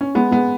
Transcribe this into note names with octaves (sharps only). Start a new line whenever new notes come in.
C#4
G#3 B3
G#3 B3